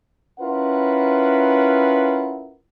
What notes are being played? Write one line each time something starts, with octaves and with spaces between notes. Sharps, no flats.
C#4 E4 F4 A#4 B4 F#5